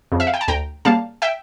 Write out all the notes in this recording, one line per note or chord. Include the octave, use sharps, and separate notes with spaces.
F2 C#3
E5
F5
G5
A5
D2 G5 A#5
C#3 G3 A#3 F5 A5
E5 G5